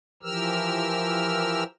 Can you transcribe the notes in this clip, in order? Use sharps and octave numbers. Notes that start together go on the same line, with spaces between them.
E3 F3 G4 A#4 E6 F6